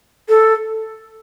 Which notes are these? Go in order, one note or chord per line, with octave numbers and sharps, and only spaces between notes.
A4